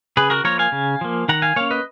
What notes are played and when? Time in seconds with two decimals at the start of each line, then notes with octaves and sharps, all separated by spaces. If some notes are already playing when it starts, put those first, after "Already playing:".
0.17 C#3 G#4 B4
0.30 F#4 A#4
0.44 F3 A#3 A#4 C#5
0.59 F5 G#5
0.72 C#3
1.01 F3 A#3
1.28 D#3 F#5 A#5
1.42 F5 G#5
1.56 A#3 C#4 C#5 F5
1.71 B4 D#5